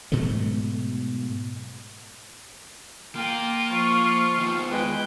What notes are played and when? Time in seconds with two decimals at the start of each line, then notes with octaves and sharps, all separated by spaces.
0.12 G#2 B2 F#3 A3
3.15 A#3 F4 A#4 G5
3.71 F3 C#6
4.39 D#3 B3
4.70 E2 G#3 B4 G5